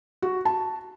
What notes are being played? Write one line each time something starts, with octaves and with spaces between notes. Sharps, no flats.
F#4
A5